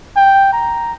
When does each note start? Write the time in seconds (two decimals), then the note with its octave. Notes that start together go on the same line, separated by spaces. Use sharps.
0.16 G5
0.53 A#5